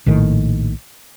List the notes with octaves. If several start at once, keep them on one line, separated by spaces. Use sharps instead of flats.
A#1 A2 D#3